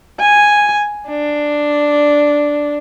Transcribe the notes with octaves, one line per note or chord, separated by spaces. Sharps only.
G#5
D4